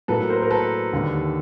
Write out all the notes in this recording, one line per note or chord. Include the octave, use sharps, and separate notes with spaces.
A2 F#3 A#3 A4 B4
A#4 C5
A#4
A4 B4
D#2 D3 G3